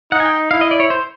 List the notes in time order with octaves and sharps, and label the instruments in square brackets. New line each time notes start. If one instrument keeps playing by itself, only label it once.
[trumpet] D#4 [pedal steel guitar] F#5
[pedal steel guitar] G#5
G5
[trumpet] E4 [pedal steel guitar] F5
[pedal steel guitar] D#5
D5
C#5
C5